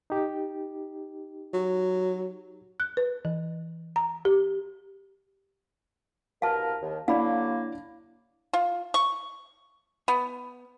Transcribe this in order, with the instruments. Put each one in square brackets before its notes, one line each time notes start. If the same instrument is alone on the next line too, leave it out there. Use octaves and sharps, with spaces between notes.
[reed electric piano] D#4 G4
[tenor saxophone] F#3
[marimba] F#6
B4
E3
A#5
G4
[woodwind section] C2 B2 A#4 [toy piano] F5 A5
[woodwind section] D#2 D#3
[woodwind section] D3 F#3 A#3 [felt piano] D4 E4 D5 [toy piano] F5 B5
[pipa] F4
C#6
B3